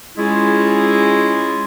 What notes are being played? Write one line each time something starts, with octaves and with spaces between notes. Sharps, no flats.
G#3 C#4 E4 F4 G#4